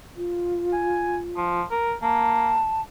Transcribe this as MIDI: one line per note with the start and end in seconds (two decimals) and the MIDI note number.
0.17 1.60 65
0.73 1.17 80
1.37 1.63 53
1.71 1.94 70
2.03 2.57 58
2.03 2.81 81